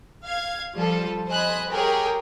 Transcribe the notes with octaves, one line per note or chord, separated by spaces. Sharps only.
F5 G#6
F3 G3 F4 A4
C5 D#5 G#5 B5 D#6 F#6
G4 G#4 A#4 C#5 G5 G#5